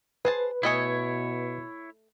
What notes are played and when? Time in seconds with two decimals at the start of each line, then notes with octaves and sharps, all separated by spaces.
0.25 G#4 B4 C5 A5
0.63 B2 A3 E4 C#5 D#5 G#5